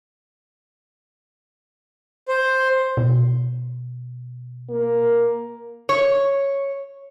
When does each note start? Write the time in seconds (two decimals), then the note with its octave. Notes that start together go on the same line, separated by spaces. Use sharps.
2.28 C5
2.97 B2
4.70 A#3
5.89 C#5